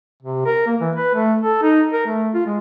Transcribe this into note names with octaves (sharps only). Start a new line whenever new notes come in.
C3
A#4
A#3
E3
B4
A3
A4
D#4
A#4
A3
F4
G#3